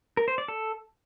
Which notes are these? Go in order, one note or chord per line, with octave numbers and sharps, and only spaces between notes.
A#4
C5
D5
A4